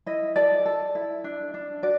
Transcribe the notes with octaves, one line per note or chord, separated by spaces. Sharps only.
E4 D#5
A4 D5
A4
E4
D4
D4
F#4 D5